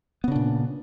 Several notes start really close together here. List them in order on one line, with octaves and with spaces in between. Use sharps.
B3 C#3 D4 A#2